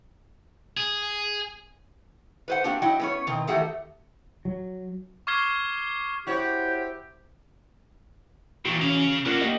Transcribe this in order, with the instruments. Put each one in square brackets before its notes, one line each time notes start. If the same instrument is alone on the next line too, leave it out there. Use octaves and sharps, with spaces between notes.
[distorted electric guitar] G#4
[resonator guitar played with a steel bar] B4 C5 F#5
A#3 C4 D4 F#4 G4
F#3 E4 D#5 F#5 G5
B3 C#4 C#5
B2 D#3 C4
D#3 E3 A3 F#4 G4 F#5
[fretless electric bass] F#3
[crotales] C#6 D6 F6 G#6 C7 G7
[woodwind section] E4 G4 [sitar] F#4 C#5 [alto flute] C5
[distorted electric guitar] A#2 D#3 [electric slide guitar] E3 F#4
[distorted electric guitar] C#3 F5 [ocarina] C#4
[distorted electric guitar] D4 F#4 [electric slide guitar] F4 A#4
[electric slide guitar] A#3 G4 D#5